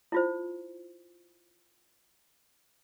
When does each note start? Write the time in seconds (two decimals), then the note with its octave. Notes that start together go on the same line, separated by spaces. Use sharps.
0.12 E4 F4 C5